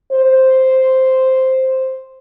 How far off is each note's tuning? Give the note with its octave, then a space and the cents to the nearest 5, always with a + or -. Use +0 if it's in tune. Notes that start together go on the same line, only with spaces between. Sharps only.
C5 +0